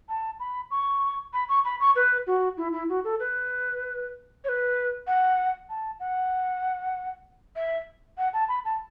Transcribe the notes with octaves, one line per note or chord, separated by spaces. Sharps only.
A5
B5
C#6
B5
C#6
B5
C#6
B4
F#4
E4
E4
F#4
A4
B4
C#5
B4
F#5
A5
F#5
E5
F#5
A5
B5
A5